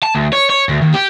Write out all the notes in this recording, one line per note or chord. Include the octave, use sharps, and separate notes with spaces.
A5
D2
C#5
C#5
D2
D#2
G4